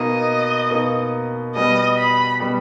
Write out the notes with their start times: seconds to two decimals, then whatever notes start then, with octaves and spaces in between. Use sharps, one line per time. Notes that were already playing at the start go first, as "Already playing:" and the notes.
Already playing: B2 A#3 D#4 D#5
0.71 B2 A#3 D#4
1.56 B2 G3 B3 D#5
1.98 B5
2.40 B2 G3 B3